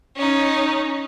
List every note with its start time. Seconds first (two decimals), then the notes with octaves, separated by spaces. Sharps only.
0.16 C#4 D#4